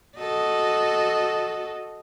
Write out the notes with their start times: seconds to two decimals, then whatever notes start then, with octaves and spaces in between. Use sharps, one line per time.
0.17 F#4 A4 D#5